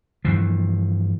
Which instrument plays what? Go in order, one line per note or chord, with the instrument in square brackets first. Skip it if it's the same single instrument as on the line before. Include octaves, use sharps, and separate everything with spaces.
[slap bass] G2 E3 F3